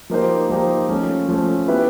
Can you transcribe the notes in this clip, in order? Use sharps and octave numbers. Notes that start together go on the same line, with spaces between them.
F3 A#3 D#4 G4 C5
F3 A#3 D#4 G4 C5
F3 A3 C#4
F3 A3 C#4
B3 E4 G4 B4